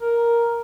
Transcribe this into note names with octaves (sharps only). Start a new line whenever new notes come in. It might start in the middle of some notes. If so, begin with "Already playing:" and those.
A#4